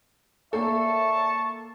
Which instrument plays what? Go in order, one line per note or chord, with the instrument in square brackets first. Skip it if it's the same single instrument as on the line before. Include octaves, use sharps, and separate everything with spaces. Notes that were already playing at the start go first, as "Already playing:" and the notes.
[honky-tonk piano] A#3 A4 [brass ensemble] C#5 D5 E5 [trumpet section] A5 C#6